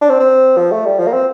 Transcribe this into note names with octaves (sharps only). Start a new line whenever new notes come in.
D4
C4
C4
F3
A3
G3
F3
A#3
C4